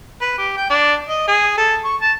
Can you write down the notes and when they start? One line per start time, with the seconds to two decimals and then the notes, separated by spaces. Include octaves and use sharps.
0.21 B4
0.38 G4
0.57 G5
0.70 D4
1.09 D#5
1.28 G#4
1.57 A4
1.84 C#6
2.01 A5